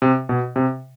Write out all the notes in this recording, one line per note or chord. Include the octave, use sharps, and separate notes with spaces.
C3
B2
C3